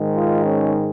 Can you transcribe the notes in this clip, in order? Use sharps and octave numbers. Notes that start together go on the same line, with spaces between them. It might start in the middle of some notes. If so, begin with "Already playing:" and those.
Already playing: G#2 D#3 G#3
F4
C#4